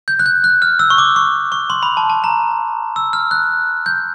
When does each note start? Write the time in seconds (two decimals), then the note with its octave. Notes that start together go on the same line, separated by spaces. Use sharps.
0.08 G6
0.19 F#6
0.26 G6
0.44 F#6
0.62 F6
0.79 E6
0.90 C#6
0.98 D6
1.16 C#6
1.52 C#6
1.70 C6
1.83 B5
1.97 A5
2.10 A5
2.24 A#5
2.96 E6
3.13 F6
3.31 F#6
3.86 G6